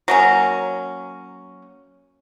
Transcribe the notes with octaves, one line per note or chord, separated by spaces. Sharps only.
F#3 A#3 C#4